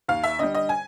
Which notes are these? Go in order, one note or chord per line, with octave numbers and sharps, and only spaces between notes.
D#2 F5
E5
D3 G3 D#5
D#5
G#5